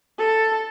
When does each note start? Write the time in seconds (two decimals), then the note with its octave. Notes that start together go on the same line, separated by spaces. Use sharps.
0.19 A4